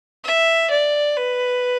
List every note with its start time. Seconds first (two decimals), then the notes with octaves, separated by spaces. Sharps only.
0.24 E5
0.70 D5
1.16 B4